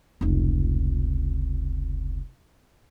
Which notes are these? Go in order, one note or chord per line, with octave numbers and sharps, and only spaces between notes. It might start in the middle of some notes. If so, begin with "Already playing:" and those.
F1 C#2